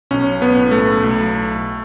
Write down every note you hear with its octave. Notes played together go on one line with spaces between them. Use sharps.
B1 C#4
B3
A2
A3
B1